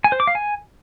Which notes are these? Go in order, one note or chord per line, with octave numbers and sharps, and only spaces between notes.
G#5
C5
D6
F5
G#5